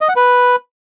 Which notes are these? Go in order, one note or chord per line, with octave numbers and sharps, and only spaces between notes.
D#5
F#5
B4